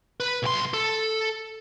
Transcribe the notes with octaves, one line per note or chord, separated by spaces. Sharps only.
B4
B1 C6
A4